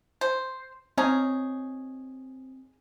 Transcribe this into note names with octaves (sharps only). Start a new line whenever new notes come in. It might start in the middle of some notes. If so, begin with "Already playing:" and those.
C5
C4 C#4 D#4 G#4